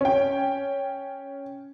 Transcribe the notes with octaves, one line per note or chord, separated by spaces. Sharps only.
C#4 G5